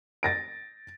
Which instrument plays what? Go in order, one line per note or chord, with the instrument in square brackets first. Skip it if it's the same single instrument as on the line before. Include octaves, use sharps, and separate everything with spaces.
[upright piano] A6 A#6 D7